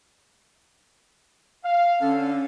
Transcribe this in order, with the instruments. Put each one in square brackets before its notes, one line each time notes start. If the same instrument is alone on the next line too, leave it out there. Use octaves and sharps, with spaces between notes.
[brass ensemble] F5
[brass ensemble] D3 A4 [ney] C#4